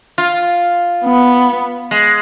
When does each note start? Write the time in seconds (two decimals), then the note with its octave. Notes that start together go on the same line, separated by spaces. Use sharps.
0.18 F4
1.05 B3
1.91 G#3